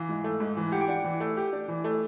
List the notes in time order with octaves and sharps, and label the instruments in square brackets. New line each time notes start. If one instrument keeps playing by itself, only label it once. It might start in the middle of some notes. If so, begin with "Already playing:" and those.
Already playing: [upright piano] E3 [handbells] F5
[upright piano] G#2
A3
G#2
E3
[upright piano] G4 [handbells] F#5
[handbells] G5
[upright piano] D4 [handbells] F#5
[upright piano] E3
A3
G4
D4
E3
A3